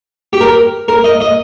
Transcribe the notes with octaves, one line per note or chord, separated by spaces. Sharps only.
G4
A#4
A#4
D#5
D#5